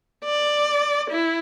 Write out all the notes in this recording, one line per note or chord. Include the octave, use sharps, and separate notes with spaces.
D5
E4